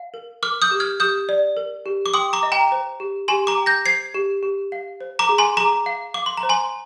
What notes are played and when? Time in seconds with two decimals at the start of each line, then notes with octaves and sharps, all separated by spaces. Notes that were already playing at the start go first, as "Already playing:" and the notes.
Already playing: F5
0.14 A#4
0.43 A#4 D6 F6
0.62 D#6 G6
0.71 G4
0.80 F6 G#6
1.00 G4 D#6 G6
1.29 D5
1.57 A#4
1.86 G4
2.06 D6
2.14 G5 C6 D#6
2.33 A#5 D6
2.43 D#5
2.52 G5 A#5
2.72 C5
3.00 G4
3.28 G4 G#5 C6
3.47 A#5 D6
3.58 G5
3.66 G6 A#6
3.85 C5 G#6 C7
4.14 G4
4.43 G4
4.72 F5
5.01 C5
5.19 A#5 D6
5.29 G#4
5.38 G#5 C6
5.57 G#4 A#5 D6
5.86 F5
6.14 F5 D6
6.26 C6
6.37 A#5
6.43 C5
6.49 G#5 C6